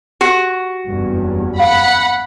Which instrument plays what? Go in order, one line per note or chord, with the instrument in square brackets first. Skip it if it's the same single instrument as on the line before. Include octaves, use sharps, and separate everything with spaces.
[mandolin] F#4 [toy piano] G4
[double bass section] F#1 E2 G2
[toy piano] F5 [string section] F#5 B5